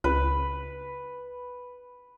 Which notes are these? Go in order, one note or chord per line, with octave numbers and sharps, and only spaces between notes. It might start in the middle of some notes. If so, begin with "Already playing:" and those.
C#2 B4